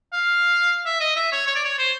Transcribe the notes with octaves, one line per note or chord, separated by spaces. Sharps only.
F5
E5
D#5
E5
C#5
C#5
D5
C#5
C5